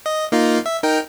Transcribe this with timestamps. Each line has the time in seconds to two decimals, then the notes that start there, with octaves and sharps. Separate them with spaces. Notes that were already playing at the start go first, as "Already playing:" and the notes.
0.06 D#5
0.32 A#3 D#4 F4
0.66 E5
0.83 D#4 A#4 G5